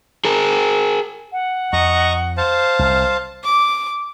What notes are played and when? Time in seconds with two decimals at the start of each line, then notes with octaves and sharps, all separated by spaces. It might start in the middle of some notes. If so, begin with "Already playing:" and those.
0.25 G#4 A#4
1.32 F#5
1.73 F2 D#5 A#5 C#6
2.37 C5 F5 A5
2.79 C2 F6
3.44 D6